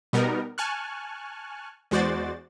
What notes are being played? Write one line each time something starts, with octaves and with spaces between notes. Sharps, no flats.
B2 G3 B3 D#4 A#4
G#5 A5 C#6 F6 F#6
E2 G#3 F#4 C5 D5 A6